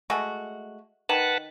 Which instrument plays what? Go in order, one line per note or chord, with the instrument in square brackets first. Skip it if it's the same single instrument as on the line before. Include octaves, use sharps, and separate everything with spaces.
[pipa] G#3 A3 F#4
[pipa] D#3 [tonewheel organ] B4 F#5 A5